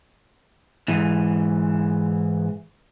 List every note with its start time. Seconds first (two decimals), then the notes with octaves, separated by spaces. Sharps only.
0.88 G#2 E3